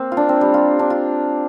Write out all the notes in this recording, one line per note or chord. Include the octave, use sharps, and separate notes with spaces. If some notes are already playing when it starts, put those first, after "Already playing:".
Already playing: A#3 C4
F4
D4
C4
G3
F4
D4
F4